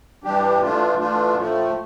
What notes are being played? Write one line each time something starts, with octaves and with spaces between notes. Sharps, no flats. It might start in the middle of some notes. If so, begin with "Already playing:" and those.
G2 E3 G3 D4 G4
E3 A3 D4 F4
E3 A3 D4 F4
A2 F3 A3